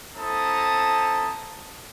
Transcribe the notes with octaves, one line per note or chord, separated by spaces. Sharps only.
C4 E4 A4 A5 A#5 D#6